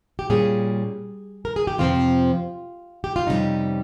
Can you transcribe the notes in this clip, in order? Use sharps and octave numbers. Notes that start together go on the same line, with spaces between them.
G4
A#2 G3 C#4 G#4
A#4
G#4
G4
F2 C3 F3 C4 F4
G4
F4
F2 C3 D#3 G3 C#4 D#4